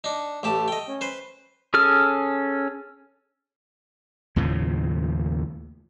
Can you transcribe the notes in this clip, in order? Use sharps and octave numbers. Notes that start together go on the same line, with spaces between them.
D4 D#4
A1 A3 G4 A5
D#5 G5
C#4
B4 C5
C#4 G#4 A4 F6
D#2 A2 C#3 F3